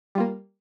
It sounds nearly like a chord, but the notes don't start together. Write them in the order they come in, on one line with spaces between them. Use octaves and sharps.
G3 F4 A#3